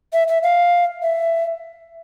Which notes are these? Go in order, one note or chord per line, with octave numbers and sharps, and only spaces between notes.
E5
E5
F5
E5